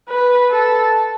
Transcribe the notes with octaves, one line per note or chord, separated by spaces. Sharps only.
B4
A4